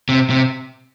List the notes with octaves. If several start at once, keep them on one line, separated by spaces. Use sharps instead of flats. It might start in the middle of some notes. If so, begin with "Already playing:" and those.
C3
C3